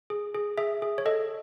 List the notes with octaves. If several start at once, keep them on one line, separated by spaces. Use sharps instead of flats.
G#4
G#4
G#4 E5
G#4
C#5
A4 D#5